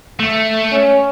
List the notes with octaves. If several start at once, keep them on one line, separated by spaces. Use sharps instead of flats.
A3
C#4